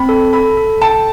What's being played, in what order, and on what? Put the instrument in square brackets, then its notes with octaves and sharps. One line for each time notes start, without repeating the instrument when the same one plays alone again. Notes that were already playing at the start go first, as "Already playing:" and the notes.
Already playing: [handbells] C4 [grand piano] B5
[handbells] A4
[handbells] A4 [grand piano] B5
[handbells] A4
[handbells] G5 [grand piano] A5